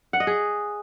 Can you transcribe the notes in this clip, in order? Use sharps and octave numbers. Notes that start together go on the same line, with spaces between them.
F#5
D#5
G#4